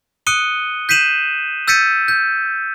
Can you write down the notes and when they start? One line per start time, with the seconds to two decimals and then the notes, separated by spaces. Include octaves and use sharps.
0.27 D#6 F#6 C#7 D#7 G7
0.89 G6 B6 C7 D#7 E7 F#7
1.68 E6 G6 A6 B6 C#7 D#7
2.08 G6